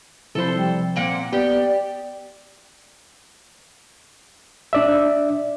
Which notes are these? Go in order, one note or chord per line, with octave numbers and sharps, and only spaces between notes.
C3 F3 E4 A4 C5
G3
A#2 A#3 C4 F#5
B3 G4 D5
D4 D5 E5